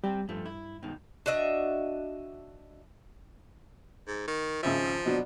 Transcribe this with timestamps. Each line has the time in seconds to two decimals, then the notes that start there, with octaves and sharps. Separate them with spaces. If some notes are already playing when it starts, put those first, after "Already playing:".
0.04 G3 C4 G4
0.29 G2 F3 A3
0.46 E4
0.83 G#2 B2 D#3
1.26 D4 F#4 D#5 E5
4.07 G#2
4.28 D#3
4.63 G#1 C#3 F3 E5
5.05 B2 F#3 D4